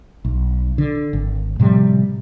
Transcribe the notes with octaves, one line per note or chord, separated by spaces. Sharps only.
B1
D3
G#1
A2 C3 F3 G3